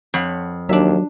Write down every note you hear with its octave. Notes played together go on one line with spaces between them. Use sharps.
F2 C#5 F#5
D#2 F#3 D4 E5